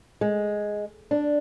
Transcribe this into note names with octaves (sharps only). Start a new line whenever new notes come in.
G#3
D4